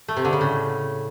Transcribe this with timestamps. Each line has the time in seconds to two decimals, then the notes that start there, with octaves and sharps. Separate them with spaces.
0.08 A3
0.16 C3
0.25 D3
0.33 C#3
0.41 A2